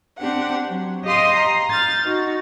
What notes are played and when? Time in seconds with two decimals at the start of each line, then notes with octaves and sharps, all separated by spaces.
0.18 C4 D4 G4 F#5
0.68 F#3
1.05 G4 D#5 F5 C6 D#6
1.36 A#5 C6
1.69 F6 G6 A6
2.04 D#4 F#4